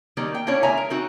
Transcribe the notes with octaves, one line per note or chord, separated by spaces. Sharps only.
D#3 F#3 G3 A#3
G5
A#3 C#4 D4 E4 A#4 C#5
D3 G#3 E5 G#5 A#5
A#4
C4 D#4 F#4